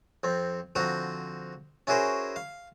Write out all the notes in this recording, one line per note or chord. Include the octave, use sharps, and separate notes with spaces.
F2 C4
D3 F3 C4 F#4 A#5
C#4 E4 F#4 G#4 A#4 C5
F5